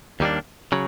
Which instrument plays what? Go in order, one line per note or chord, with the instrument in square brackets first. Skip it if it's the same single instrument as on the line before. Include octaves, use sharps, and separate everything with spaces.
[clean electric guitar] D#2 D#3 G3 A#3 D4
C#3 F#3